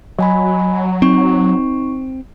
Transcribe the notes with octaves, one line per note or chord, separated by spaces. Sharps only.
F#3 D#5 G#5 B5
C4 D#4 C#6